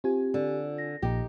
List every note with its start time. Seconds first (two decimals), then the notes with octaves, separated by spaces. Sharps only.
0.04 C4 F4 G4 G#5
0.34 D3
0.78 A#6
1.02 A#1 A#2 F3 D#4 G4